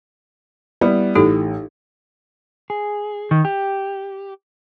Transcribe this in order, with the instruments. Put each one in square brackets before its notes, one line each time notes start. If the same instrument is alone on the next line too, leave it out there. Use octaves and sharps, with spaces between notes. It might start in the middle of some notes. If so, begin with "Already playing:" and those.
[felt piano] G3 B3 E4
[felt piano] A1 [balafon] D#4 G4 A4
[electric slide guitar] G#4
D#3
G4